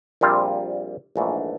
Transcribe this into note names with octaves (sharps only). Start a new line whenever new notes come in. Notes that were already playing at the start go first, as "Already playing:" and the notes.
A#1 A#2 G3 C4 F4
A#1 G#2 E3 A3 D4